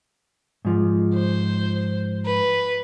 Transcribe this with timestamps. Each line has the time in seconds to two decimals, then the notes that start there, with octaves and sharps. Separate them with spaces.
0.65 G#2 F3
1.15 C5
2.26 B4